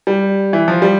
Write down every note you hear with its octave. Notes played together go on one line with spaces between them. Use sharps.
G3
E3
F3
G3